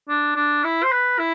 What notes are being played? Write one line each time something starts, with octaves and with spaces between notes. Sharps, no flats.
D4
D4
E4
C5
B4
E4